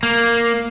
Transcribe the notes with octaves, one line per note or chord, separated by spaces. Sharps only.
A#3